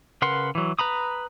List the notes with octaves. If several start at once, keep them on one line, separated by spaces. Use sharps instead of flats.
C#3 A#4 B4 F#5 C6
E3 F#3
B4 A#5 B5 D#6